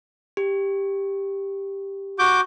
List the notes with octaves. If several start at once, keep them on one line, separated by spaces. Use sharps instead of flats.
G4
F#4 D6 G6